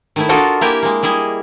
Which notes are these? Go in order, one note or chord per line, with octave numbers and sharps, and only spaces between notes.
D#3 A3 E4
D4 F4 F#4 A4 A#4 D#5
A#3 E4 G4 A#4 G5 G#5
G#3 A#3
G3 E4 G#4 D#5